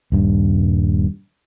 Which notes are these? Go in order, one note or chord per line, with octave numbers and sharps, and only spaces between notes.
D#1 G2